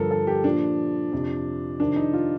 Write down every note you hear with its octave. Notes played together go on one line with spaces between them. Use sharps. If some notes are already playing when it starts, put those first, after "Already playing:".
Already playing: G2 D3 F3 A4 A#4
A4
G4
A#2 F3 D4
F2 C3 F3
F2 C3 D#3 D4
D#4
F4